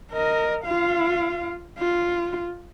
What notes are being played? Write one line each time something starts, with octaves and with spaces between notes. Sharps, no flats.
A#4 D#5
F4 F5
F4